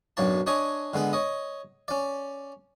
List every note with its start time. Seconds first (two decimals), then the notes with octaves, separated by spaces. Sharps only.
0.17 B1 F#2 B2 D4 C#5 A5
0.46 D4 C#5 D#5 G#5 C#6
0.93 D3 G#3 B3 B4
1.13 C#5 D#5
1.88 C#4 D5